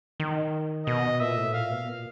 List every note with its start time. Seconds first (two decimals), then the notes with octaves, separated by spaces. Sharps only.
0.20 D#3
0.86 B2 D#5
1.20 A#2 E5
1.37 A2
1.54 A#2 F5
1.71 B2
1.88 A#2